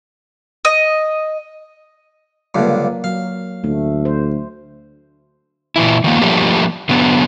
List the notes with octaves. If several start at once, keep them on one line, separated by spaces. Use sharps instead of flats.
D#5
C#2 G2 D3 F#3 A#3
F#3 F5
D2 A3
C5
A#2 E3 E4
D#3 F3 A#3
F3 G3 A3 A#3 D4 G4
D3 F#3 B3